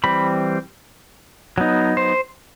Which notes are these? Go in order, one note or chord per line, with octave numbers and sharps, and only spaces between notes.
E3 G3 C4 B5
F#3 B3 D#4
C5